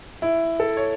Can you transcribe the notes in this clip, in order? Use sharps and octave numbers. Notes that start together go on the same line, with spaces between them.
E4
A4
C#5